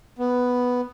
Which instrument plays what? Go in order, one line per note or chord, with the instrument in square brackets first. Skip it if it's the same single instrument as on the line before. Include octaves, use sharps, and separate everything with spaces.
[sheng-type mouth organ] B3